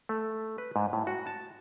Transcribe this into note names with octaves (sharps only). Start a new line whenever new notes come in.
A3
B4
G#2
A2
F#4
A5